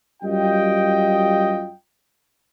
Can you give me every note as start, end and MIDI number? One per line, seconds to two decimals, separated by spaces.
0.23 1.70 42
0.23 1.70 55
0.23 1.70 65
0.23 1.70 75
0.23 1.70 79